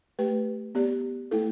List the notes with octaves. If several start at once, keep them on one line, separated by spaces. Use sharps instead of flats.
A3 G4 B4
B3 G4 D5
A3 E4 A4